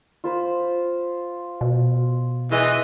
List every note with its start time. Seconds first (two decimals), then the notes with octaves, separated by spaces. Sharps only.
0.24 F4 C5 B5
1.61 B2
2.52 E3 G#3 D#5